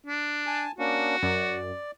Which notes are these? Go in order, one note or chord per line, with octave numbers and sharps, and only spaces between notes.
D4
G#5 A5
A#3 C#4 D4 F#4
F#2 D5